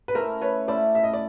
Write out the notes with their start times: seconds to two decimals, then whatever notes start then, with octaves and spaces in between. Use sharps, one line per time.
0.08 B4
0.15 A3 C#4 E4 A#4 C5
0.41 B4 C#5
0.68 A3 C#4 E4 C5 D5
0.95 E5
1.03 D#5
1.13 D5